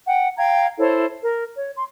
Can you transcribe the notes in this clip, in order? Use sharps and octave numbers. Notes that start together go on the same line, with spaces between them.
F#5 G5
F5 G5 A#5 G#6
E4 A4 C5 C#5
A#4
C#5
C6